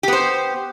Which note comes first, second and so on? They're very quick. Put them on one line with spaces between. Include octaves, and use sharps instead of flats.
G4 B3 C5